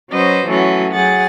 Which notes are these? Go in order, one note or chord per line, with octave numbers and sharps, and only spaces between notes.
F#3 C#4 F#4 B4 C5 D#5
E3 F#3 A3 B3 C#4 F#4
F#3 G#4 F#5 A6